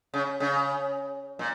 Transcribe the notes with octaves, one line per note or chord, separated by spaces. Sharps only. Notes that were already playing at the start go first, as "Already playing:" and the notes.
C#3
C#3
A#2